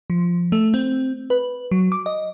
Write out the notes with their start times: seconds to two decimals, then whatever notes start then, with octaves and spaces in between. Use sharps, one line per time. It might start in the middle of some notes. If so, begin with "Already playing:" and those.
0.10 F3
0.52 A3
0.74 C4
1.30 B4
1.71 F#3
1.92 D6
2.06 D#5